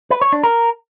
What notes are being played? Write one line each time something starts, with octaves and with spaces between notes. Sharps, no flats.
B4
C#5
D4
A#4